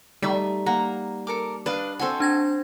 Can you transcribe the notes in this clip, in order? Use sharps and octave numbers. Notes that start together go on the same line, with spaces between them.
G3 A3 D#4 E5
A#3 F#5 A#5
A4 A#4 D6
D4 B4 D#5 F5 A5
C4 F#4 A4 C5 E5 G#5
D4 G#6 A#6